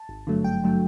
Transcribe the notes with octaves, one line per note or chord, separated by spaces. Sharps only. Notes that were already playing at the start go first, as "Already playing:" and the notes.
Already playing: A5
G#1
G2 D3 F#3 A3
G#1 G5
G2 D3 F#3 A3